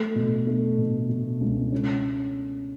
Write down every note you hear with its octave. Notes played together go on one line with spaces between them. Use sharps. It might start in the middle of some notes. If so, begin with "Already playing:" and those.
Already playing: A3
B2
A3
B2
B2
C#2
C#4